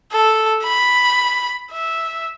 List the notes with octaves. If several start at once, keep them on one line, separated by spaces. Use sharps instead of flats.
A4
B5
E5